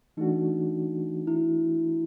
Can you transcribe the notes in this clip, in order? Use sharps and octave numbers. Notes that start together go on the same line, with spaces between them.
E3 A3 D4 D#4 F#4
E4